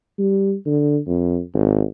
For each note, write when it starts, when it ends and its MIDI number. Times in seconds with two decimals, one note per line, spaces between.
0.18 0.54 55
0.66 0.98 50
1.07 1.41 41
1.54 1.84 32